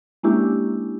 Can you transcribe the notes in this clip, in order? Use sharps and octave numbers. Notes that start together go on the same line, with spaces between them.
G#3 A#3 C#4 D4 E4 G4